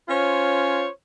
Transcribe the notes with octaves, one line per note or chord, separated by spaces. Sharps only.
C#4 F4 C5 C#5